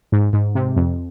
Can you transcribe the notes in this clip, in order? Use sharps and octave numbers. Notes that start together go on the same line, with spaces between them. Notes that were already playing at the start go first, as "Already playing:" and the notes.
G#2
G#2
C3
F2